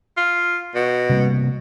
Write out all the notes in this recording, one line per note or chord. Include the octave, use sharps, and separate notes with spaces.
F4
B2
C3 G3 A#3